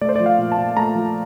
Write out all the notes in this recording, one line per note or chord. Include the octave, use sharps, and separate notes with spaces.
A3 D5
C5
F3 D5
F5
A#2
A5
A#2
A3 A#5
F3